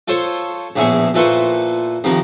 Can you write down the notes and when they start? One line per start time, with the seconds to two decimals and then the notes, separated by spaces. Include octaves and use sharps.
0.08 F4 A4 C5 C#5
0.76 A#1 E2 A2 E4 G#4 C#6
1.14 A#2 E4 A4 B4 C5 C#6
2.04 C2 F2 D#3 A#4 B5